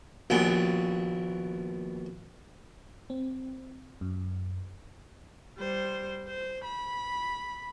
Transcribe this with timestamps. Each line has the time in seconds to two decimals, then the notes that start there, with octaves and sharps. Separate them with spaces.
0.30 A#1 D#2 B2 G#5
3.10 C4
4.01 F#2
5.58 G3 C5
6.28 C5
6.65 B5